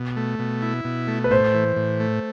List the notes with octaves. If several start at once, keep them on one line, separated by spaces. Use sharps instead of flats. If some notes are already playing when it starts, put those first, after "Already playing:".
Already playing: B2
A3
B2
E4
B2
A3
B4
A2 C5
E3
A2
A3